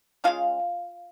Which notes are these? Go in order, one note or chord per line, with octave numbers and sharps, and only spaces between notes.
C#3 G#3 C#4 F4 F5